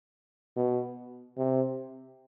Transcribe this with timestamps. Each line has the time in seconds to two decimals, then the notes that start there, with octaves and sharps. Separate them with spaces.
0.56 B2
1.37 C3